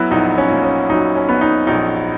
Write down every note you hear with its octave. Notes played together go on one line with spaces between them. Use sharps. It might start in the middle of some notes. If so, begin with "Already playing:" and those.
Already playing: F#3 B3 E4 F#4
A#1 D#4
C#4
A#2
C#4
F#3 D#4
C#4
B3
D#4
A#1 D#4